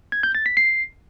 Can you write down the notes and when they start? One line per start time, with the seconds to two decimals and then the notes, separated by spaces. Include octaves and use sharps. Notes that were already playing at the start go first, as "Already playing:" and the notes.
0.12 G#6
0.23 G6
0.35 A6
0.46 B6
0.57 C7